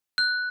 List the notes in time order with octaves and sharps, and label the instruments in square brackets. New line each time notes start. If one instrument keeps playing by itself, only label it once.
[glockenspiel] F#6